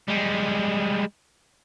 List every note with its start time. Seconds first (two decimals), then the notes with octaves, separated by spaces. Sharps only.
0.08 G3 G#3